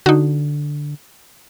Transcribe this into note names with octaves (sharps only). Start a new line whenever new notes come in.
D3 D#4 F#4